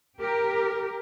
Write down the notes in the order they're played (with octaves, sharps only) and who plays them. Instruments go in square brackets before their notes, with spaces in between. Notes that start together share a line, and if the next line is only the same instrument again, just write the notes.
[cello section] G4 A#4